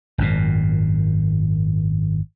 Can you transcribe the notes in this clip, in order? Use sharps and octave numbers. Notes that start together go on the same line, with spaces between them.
G#1 F#2 A#2